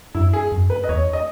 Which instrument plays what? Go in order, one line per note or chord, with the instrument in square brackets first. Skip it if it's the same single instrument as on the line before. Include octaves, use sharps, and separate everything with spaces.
[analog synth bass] F#2 [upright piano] E4
[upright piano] G#4
[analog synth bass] F#2
[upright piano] B4
D#5
[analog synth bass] E2 [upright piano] C#5
[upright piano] D#5